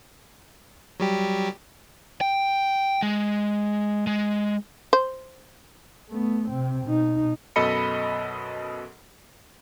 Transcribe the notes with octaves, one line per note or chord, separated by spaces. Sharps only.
F#3 G3 G4
G5
G#3
G#3
C5
A3 B3
C3 C4
B2 D#4
F#2 B2 A4 D#5 B5 C#7